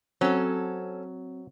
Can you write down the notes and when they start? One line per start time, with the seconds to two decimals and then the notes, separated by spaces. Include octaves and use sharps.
0.21 F#3 C4 C#4 A4